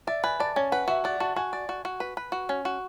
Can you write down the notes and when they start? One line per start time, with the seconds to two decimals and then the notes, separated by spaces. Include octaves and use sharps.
0.07 D5 E5
0.24 B4 G#5
0.40 D5 A5
0.56 C#4 G#5
0.72 B4 F#5
0.88 F#4 E5
1.04 D5 F#5
1.20 F#4 A5
1.36 F#4 G#5
1.53 D5
1.69 F#4
1.85 F#4
2.00 B4
2.17 B4
2.32 F#4
2.49 C#4
2.65 F#4